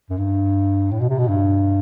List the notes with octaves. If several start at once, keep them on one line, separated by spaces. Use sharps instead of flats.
F#2
G2
A2
B2
C3
B2
G2